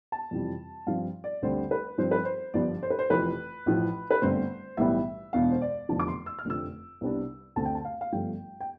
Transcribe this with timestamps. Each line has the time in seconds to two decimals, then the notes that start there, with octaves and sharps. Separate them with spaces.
0.12 A5
0.31 F2 C3 E3 G3 C4
0.87 G2 F3 C4 F5
1.24 D5
1.42 D2 D3 G3 C4 C5
1.71 B4
1.98 G2 F3 C4 C5
2.11 B4
2.25 C5
2.54 G1 G2 F3 B3 D5
2.83 C5
2.90 B4
2.99 C5
3.10 F1 F2 E3 B4
3.66 A1 A2 F3
4.11 B4
4.22 G1 G2 D3 A3 C4 C5
4.77 B1 A2 E3 G3 B3 E5
5.33 E1 E2 B2 B3 D4 F5
5.51 C5
5.62 D5
5.89 F1 E2 D3 F3 A5
5.99 D6
6.08 C6
6.26 E6
6.39 F6
6.45 F1 F2 D3 A3 C4 E6
7.01 C2 C3 G3 B3 D4
7.56 D2 D3 A3 C4 A5
7.65 G5
7.75 A5
7.85 F5
8.01 F5
8.12 G1 G2 F3 A3 G5
8.61 G5